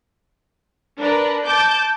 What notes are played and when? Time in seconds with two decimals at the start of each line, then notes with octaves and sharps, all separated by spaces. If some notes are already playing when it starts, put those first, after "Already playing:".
0.98 D4 A#4 B4
1.45 A5 D6 G6